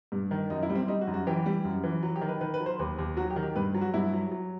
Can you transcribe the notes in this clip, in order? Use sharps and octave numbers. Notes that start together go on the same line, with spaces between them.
G2
D#3
F#2 D#4
E4
G3
C4
G3 D#4
F#4
F#2
F#4
E3 G4
G3
F#2
E3
F#3
G4
D#3
B4
D#3 B4
B4
F#3
C5
D#2 B4
D#2
F#3 F#4
G4
D#3
G4
G2 B4
F#3
F#4
G2 E4
F#3
F#3